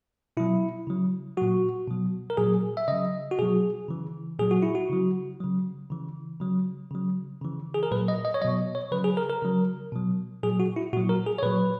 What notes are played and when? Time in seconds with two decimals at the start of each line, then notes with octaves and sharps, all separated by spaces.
0.37 B2 F#3 E4
0.87 C#3 F#3
1.37 A#2 F#3 F#4
1.88 B2 F#3
2.30 A#4
2.37 A#2 F#3 G#4
2.77 E5
2.88 C#3 F#3 D#5
3.31 F#4
3.39 B2 F#3 G#4
3.88 C#3 E3
4.39 A#2 F#3 G#4
4.51 F#4
4.62 E4
4.75 F#4
4.90 C#3 F#3
5.40 C#3 F#3
5.90 C#3 E3
6.40 C#3 F#3
6.91 C#3 F#3
7.41 C#3 E3
7.74 G#4
7.83 A#4
7.91 A#2 F#3 B4
8.08 D#5
8.25 D#5
8.34 C#5
8.42 B2 F#3 D#5
8.75 C#5
8.92 C#3 F#3 B4
9.04 G#4
9.17 A#4
9.29 A#4
9.42 C#3 F#3
9.92 B2 F#3
10.43 A#2 F#3 G#4
10.60 F#4
10.76 E4
10.93 A#2 F#3 F#4
11.09 A#4
11.26 G#4
11.38 C#5
11.43 A#2 F#3 B4